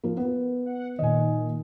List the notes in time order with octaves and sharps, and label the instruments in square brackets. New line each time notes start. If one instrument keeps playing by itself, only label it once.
[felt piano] F3 A#3
B3
[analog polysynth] F#5
[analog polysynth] A#2 D#3 [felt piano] D#5 G#5